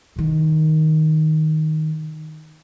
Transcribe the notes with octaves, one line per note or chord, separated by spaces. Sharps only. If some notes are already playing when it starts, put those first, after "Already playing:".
C3 D#3